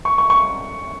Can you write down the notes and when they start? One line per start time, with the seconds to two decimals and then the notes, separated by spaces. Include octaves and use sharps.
0.05 C#6
0.18 C#6
0.30 C#6